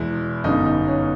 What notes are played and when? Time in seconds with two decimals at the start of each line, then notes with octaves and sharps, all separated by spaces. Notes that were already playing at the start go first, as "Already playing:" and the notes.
Already playing: E2 B2 G#3 E4
0.44 G1 F#2 D3 G3 B3 D#4
0.66 D#4
0.88 C#4